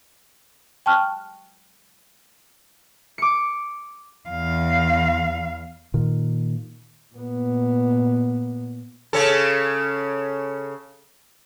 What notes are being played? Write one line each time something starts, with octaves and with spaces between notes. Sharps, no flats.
G5 A5 C#6 F6 F#6
D6 C#7
E2 F5
A#2 D#3
A#2 B3
C#3 C#4 A4